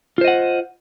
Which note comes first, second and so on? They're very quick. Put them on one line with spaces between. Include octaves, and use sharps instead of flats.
F4 C5 D#5 F#5